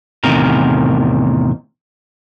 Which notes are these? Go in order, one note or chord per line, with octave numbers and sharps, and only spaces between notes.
E2 A2 C3 D#3 A#4